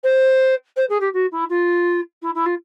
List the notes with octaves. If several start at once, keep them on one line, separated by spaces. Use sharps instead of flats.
C5
C5
G#4
G4
F#4
E4
F4
E4
E4
F4